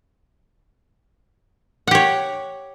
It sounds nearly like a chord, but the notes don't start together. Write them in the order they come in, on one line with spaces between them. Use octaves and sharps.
F#5 G4 C#5